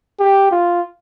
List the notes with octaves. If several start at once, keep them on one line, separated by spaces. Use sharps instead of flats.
G4
F4